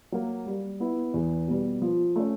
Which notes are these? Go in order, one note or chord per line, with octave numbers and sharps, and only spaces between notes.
F#3 A#3
G3
B3 E4
E2
B2 G3
F3
A3 C#4